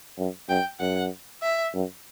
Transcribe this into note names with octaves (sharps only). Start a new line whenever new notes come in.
F#2
F#2 G5
F#2 F#5
E5
F#2